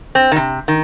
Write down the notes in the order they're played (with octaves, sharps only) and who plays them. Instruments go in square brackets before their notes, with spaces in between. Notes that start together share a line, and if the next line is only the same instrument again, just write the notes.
[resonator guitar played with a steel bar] C4
D#3
C3
D#3